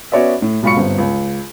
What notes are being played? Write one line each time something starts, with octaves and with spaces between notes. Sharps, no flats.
B3 C#4 F#4 C#5 D5 E5
A2
B1 G#2 F4 B5 C#6 C#7
G1 G2 C4
C#2